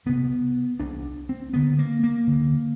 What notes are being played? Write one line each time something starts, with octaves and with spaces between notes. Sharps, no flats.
C2 C3 B3
C2 C3 D4
C4
D2 D3 B3
A#3
A#3
D2 D3